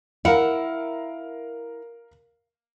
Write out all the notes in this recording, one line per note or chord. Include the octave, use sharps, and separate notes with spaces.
E4 A#4 F5 F#5